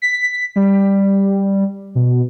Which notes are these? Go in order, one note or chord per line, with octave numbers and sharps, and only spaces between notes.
B6
G3
B2